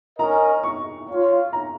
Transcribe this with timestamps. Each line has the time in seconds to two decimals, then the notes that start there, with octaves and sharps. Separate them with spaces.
0.19 C#4 A#4 D#5 A#5
0.63 C#6
1.08 F4 C#5 F5
1.53 A#5